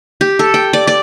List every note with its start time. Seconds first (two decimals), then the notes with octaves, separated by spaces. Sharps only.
0.21 G4
0.39 A4
0.54 G5
0.73 D5
0.87 D5